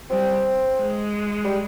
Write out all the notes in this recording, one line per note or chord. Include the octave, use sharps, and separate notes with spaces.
G3 C4
G#3
G3